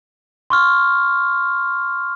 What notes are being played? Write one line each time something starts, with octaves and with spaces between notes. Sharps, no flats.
C6 C#6 F6